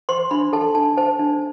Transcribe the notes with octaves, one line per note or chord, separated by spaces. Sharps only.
C5 C6
D4 B5
A4 A5
D4 A5
C5 A5
D4